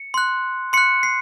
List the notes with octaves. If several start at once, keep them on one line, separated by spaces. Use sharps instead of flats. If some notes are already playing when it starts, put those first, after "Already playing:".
Already playing: C#7
C6 F#6
C6 F#6 C#7
C7